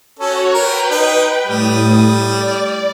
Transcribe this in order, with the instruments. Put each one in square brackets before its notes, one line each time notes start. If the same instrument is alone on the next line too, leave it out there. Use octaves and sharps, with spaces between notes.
[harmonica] C#4 A4 [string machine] F#4 C#5
[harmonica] A#4 [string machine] B4 G5
[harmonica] D#4
[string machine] A2 D#6 [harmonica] G3
[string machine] D5